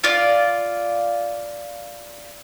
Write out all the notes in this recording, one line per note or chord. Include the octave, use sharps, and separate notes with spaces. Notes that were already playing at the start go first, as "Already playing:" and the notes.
F4 D5